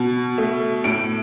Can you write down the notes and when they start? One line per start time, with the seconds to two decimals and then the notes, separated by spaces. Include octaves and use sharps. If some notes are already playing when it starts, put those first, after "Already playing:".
Already playing: B2
0.38 A3
0.84 A2 D7